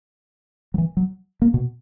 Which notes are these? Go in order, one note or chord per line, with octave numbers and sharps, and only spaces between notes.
F#3
E3
F#3
A#3
B2